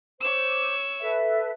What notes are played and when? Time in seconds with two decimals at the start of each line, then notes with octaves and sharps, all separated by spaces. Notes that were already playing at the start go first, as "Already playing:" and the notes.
0.21 C5 C#5 D6 E6
1.00 A4 B4 E5